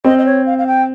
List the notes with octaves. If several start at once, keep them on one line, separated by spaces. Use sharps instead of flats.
C4 D#5
D#5
C#5
F5
F5
G5